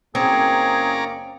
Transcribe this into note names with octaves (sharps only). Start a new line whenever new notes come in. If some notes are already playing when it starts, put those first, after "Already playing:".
F#1 A#3 C4 C#4 G#4 D5 A#5